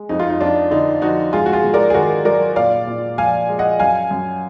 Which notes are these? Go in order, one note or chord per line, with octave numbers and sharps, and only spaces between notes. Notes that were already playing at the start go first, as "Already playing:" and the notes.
Already playing: G#3
F2 D#4
F4
D#4
F2 D4 F4
D3 D#4
F3 D#4 F#4
G#2 F4 G#4
F#4
F4 G#4
G#2
A#4 D5
G#4
D#3 F#4 A#4
F#3 A#4 D5
A#2 D5 F5
A#2
F3 F5 G#5
G#3
D#5 F#5
F#2 F5 G#5
F#2